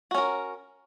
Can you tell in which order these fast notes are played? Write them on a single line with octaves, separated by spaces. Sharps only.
F#4 C#4 A#4